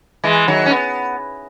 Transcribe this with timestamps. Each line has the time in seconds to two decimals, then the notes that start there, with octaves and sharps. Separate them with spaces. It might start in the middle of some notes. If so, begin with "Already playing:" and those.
0.24 E3 G#3
0.48 D#3 F#3
0.66 C#4
0.71 B3